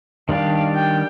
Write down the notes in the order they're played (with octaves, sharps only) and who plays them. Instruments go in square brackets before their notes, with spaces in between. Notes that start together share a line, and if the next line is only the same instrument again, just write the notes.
[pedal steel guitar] D#3 G3 D4 G4 [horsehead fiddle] F5
[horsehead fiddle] G5